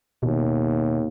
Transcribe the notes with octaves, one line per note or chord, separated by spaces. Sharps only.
D#2 B2